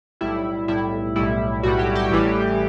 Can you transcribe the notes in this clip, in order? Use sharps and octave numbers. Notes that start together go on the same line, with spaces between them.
B1 A2 G3 E4
B1 A2 G3 E4
B1 A2 G3 E4
B1 A2 G3 F#4
G4
G4
A1 A2 E3 G3